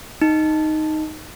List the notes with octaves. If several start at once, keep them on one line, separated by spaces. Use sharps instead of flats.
D#4